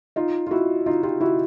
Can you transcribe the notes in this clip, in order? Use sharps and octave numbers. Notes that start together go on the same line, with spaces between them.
D#4 F4
F4
E4 F#4
D#4 F4
F4 G4
E4 F#4